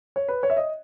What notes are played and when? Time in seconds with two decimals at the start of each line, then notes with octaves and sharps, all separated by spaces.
0.16 C#5
0.28 B4
0.43 C#5
0.50 E5
0.57 D#5